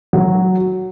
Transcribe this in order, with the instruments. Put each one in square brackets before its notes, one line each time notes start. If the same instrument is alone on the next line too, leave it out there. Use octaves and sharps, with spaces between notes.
[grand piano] F#3